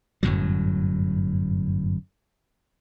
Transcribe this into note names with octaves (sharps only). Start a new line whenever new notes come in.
G1 F#2 A2 F#3